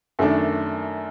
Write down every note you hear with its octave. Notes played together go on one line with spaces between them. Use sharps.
F#2 D#3 A3 D4